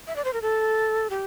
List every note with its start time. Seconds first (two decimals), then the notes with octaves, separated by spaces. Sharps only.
0.07 E5
0.16 D5
0.25 C5
0.33 A#4
0.42 A4
1.10 G4